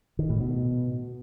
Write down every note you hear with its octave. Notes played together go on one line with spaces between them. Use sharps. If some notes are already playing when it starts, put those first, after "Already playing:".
D#3
A2
B2